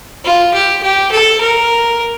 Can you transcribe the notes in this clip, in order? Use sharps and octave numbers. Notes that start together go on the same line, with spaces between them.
F4
G4
G4
A4
A#4